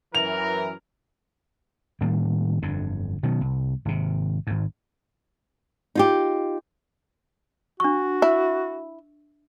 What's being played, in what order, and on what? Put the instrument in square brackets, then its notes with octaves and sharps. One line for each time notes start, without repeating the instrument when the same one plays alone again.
[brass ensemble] F#2 E3 A#4 [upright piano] F7
[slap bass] A2 D#3 G3 A#3
G1 F2 D3
B2 D#3 F#3
C2
G#1 C3
G#1 G#2
[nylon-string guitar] D#4 F4 G4
[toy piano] D4 C#6 [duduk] F#4
[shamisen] E4